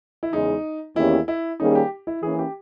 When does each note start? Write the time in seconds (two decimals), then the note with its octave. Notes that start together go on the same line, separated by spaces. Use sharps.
0.23 E4
0.32 E2 C#3 G#3 D#4
0.96 E2 D#3 A#3 C#4 E4 G4
1.28 E4
1.60 D#3 G3 A#3 C#4 D#4 G#4
1.75 G4
2.07 E4
2.23 E3 A#3 C#4 G#4
2.39 G4